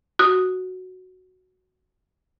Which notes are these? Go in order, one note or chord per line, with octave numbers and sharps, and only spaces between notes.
F#4 D#6